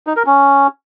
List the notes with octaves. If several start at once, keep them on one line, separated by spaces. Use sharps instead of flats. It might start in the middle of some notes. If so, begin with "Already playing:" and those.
D#4
A#4
C#4